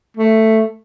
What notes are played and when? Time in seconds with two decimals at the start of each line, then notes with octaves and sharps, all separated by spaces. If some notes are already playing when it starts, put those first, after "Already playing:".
0.17 A3